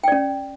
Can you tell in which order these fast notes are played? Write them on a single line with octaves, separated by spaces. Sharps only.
G5 D5 C#4